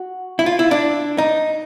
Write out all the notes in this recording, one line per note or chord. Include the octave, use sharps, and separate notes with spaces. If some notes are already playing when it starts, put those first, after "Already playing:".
Already playing: F#4
E4
F4
E4
D4
D#4